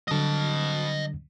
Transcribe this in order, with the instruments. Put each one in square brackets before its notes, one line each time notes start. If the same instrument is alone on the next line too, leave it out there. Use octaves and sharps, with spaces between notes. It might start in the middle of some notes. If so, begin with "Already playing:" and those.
[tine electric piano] D3 F#3 G3 [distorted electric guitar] D#5 A5